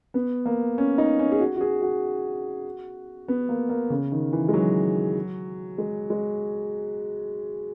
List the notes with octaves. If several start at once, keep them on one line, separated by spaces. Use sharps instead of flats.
B3
A#3
C#4
D#4
C#4
G#4
F#4
F#4
G#4
F#4
B3
A#3
A#3
C#3
D#3
E3
G#3
F#3
G#3
G#3